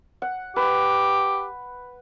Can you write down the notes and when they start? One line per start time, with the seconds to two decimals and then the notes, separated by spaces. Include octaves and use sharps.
0.22 F#5
0.56 G4 B4